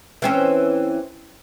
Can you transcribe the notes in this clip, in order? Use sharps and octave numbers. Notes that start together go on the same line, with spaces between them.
E3 C4 C#4